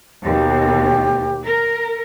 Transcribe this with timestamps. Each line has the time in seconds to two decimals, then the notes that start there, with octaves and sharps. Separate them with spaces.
0.24 D#2 B2 G4
1.44 A#4